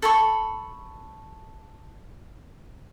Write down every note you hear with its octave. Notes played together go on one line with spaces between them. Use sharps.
A4 B5 C#6